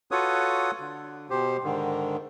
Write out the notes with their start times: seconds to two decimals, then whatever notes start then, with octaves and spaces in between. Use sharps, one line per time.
0.11 F4 F#4 A4 B4 C#5 D#6
0.80 D3
1.30 B2 G4 C5
1.64 G#2 D3 D#3